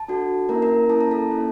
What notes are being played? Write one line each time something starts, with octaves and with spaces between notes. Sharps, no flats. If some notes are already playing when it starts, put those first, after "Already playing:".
Already playing: A5
D4 F#4 A4
A#3 C#4 E4 A#4 A#5
A#4 A#5
A#3 C#4 E4 A5
A#5
A4 A5
A#3 C#4 E4